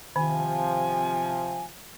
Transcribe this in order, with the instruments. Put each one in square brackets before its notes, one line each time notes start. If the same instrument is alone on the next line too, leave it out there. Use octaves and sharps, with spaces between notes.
[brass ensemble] C3 F3 [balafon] D#3 [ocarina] G#5